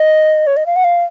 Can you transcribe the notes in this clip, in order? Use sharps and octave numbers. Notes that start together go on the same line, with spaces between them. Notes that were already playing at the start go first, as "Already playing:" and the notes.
Already playing: D#5
C#5
D#5
F5
F#5
F5